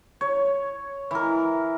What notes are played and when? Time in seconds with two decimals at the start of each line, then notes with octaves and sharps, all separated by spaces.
0.21 C#5
1.11 E3 A#4